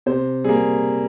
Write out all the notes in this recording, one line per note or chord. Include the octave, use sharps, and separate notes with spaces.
C3 C5
G3 A#3 G#4